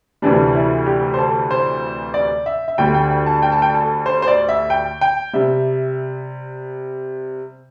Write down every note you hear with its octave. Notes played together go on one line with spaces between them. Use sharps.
D2 C3 E3 G3 D4
E4
G4
C5
A4
C5
D5
E5
E5
D2 D3 G3 G5
G5
G5
A5
G5
A5
G5
A4
C5
C5
D5
E5
G5
G5
C3 G3 E5